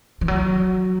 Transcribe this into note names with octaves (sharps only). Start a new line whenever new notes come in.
E3
F#3